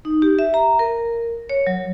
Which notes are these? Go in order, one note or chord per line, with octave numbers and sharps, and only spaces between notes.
D#4
G4
E5
A#5
A#4
C#5
F#3